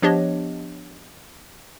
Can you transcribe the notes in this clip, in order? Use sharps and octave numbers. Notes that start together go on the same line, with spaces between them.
F3 B3 D4 G4 C#5 D#5